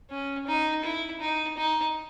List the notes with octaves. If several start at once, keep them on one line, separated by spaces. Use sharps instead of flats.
C#4
D#4
E4
D#4
D#4